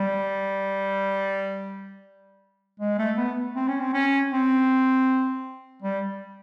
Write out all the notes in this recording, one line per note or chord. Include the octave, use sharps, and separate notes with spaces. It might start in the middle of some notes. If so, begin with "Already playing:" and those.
Already playing: G3
G#3
A3
B3
C4
C#4
C4
C#4
C4
G3